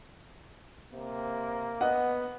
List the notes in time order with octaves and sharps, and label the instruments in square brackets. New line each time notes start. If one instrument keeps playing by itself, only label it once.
[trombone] C3 [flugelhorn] A#3
[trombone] B3 [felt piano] D#5 F#5